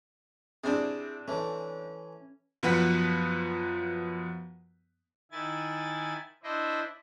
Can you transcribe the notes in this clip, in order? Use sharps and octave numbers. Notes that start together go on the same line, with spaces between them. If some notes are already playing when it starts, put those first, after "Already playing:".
C3 C4 D4 E4 G#4
E3 A3 C#4
F#2 F3 B3 B4 F#5 B6
D#3 E4 G#5 A6
D4 E4 C5 D#5 E5